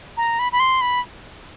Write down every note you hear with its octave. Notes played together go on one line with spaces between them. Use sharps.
A#5
B5
B5
C6
B5